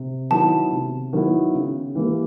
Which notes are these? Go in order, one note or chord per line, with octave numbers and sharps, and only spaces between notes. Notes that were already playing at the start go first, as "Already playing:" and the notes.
Already playing: C3
D#3 F#3 B3 E4 A5
C3
D#3 F#3 B3 E4
C#3
E3 G3 A#3